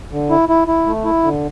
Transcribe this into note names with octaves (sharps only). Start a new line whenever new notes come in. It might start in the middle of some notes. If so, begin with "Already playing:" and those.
D3
E4
E4
E4
A3
E4
D3